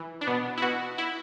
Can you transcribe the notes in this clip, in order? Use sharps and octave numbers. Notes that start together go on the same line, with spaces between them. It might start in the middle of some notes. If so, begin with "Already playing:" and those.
Already playing: E3
D4
B2 B3
E4
B2 F#4
E4